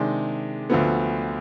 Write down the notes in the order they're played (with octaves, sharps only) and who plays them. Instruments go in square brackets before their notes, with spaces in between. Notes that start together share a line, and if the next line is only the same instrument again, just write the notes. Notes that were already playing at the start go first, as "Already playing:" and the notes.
Already playing: [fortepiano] C3 D#3 G#3 D4
D2 D3 F3 B3